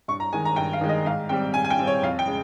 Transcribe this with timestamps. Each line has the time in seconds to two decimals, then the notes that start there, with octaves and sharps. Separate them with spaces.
0.08 G2 C#6
0.20 A#5
0.33 D#3 G#3 G#5
0.45 A#5
0.56 G2 G5
0.73 F5
0.81 D#3 G#3
0.89 D#5
1.06 G#2 F5
1.29 G3 C4 G5
1.54 G#2 G#5
1.65 G#5
1.70 G5
1.79 G3 C4
1.87 C#5
2.03 F2 F5
2.19 G5
2.27 C#3 G#3